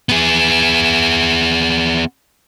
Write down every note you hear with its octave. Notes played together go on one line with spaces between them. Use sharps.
B3 G#4